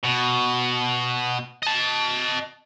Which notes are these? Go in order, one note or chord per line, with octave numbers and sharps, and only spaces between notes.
B2
D#5 A5